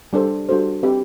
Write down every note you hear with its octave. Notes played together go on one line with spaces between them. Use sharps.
G3 D4 A4 C5
G3 D4 F#4 A4 C5
C4 G4 B4